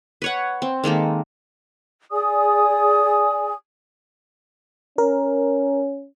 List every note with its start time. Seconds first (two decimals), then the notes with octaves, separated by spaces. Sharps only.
0.22 B4 C#5 F#5
0.62 C4
0.84 D#3 G#3 A#3 A4
2.11 G#4 D5 G#5 D#6
4.98 C#4 A#4